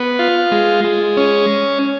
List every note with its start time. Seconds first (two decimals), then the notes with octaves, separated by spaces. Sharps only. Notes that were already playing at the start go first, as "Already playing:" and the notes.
Already playing: B3
0.19 F4
0.52 G#3
0.84 G#3
1.17 C#4